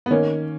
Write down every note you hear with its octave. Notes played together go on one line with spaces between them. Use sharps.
B3
D#3 A#3 C#4